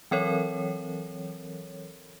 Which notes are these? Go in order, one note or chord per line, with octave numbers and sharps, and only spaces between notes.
E3 F#3 C4 A4 A#4 C#5